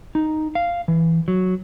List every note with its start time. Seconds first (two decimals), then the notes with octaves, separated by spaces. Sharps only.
0.15 D#4
0.55 F5
0.88 E3
1.28 F#3